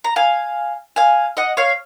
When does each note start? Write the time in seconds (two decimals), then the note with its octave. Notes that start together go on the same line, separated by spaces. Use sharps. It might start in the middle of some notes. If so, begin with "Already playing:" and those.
0.04 A#5
0.16 F5 G#5
0.96 F5 G#5
1.37 D#5 F#5
1.57 C#5 F5